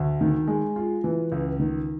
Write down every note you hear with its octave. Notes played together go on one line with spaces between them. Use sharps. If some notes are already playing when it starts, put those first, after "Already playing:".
Already playing: D2
D#3
G#3
F4
E3
C#2
D#3